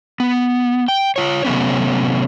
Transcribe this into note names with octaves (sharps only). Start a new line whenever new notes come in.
B3
G5
F4 C#5
C3 F#3 A3 B3 C#4